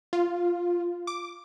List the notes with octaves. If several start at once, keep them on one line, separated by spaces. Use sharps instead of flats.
F4
D6